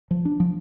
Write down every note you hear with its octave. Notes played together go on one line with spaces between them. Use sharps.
F3
D4
F3